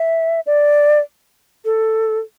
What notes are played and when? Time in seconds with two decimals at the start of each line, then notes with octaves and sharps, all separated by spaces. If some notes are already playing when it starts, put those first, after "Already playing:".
Already playing: E5
0.46 D5
1.65 A4